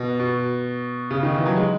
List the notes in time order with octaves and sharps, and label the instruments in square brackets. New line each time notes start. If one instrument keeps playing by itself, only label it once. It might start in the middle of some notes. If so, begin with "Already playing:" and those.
Already playing: [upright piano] B2
B2
C#3
D#3
E3
F#3
G#3